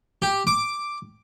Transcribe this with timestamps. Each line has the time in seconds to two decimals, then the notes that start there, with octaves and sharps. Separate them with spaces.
0.22 G4
0.47 D6